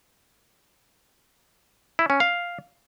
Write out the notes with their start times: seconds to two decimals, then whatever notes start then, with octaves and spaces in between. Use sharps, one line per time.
1.99 E4
2.10 C#4
2.20 F5